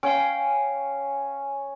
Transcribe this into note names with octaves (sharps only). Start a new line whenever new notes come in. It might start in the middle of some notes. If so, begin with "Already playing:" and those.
C#4 F5 G5